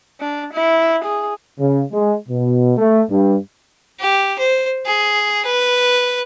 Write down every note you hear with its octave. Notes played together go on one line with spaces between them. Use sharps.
D4
E4
G#4
C#3
G#3
B2
A3
G2
G4
C5
G#4
B4